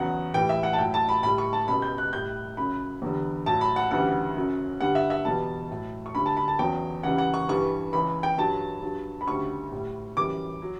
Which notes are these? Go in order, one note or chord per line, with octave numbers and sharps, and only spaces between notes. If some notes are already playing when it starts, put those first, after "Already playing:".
Already playing: E2 C#3 F#3 F#5
A2 E3 G3 G5
E5
F#5
A5
A2 F#3 G5
A5
B5
A2 G3 B5
C#6
A5
C#2 B2 G3 B5
G6
F#6
A2 G3 G6
F#2 C#3 F#3 B5
E2 D3 G3
A2 F#3 A5
B5
F#5
D2 C#3 E3 G3 F#5
F#2 C#3 F#3
G2 D3 G3 F#5
E5
E5
E2 B2 G3 A5
A2 F#3
C#6
D2 D3 G3 B5
A5
B5
A5
E2 C#3 F#3 G5
C#2 C#3 E3 G3 F#5
F#5
C#6
G2 E3 G3 C#6
C#2 C#3 E3 B5
G5
G2 F#3 A5
G2 F#3
B5
D2 C#3 G3 C#6
A2 G3
F#2 E3 G3 D6
F#3